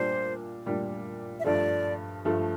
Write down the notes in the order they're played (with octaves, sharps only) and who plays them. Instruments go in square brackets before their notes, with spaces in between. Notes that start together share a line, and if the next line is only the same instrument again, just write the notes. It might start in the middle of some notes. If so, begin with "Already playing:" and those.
Already playing: [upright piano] A#2 G3 D4 [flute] C5
[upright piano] A#2 G3 D4
[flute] E5
[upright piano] G2 F3 A3 [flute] D5
[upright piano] G2 F3 A3